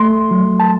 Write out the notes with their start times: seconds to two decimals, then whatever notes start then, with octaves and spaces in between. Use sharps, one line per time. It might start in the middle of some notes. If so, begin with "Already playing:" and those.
Already playing: A3 C6
0.31 F#3
0.60 A5